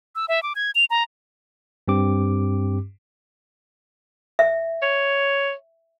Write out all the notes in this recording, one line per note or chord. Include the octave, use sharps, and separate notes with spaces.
E6
E5
D6
G#6
F7
A#5
G2 C4 G4 D6
E5
C#5